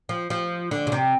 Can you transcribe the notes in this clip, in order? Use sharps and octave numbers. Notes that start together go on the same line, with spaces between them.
F3
F3
D3
C#3
C3